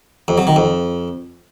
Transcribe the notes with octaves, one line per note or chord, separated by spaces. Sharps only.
F2
F#3
D#3
F2